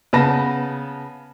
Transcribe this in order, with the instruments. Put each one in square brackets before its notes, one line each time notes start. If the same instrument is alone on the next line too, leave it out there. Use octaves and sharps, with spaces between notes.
[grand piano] C#3 B3 B4 A5 A#6